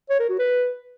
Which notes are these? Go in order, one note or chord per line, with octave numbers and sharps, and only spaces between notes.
C#5
A#4
F#4
B4